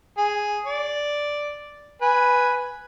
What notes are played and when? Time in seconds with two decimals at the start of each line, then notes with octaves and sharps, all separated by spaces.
0.18 G#4
0.65 D5
2.02 B4 G#5